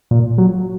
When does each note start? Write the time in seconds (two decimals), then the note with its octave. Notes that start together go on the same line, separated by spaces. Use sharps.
0.11 A#2
0.38 F#3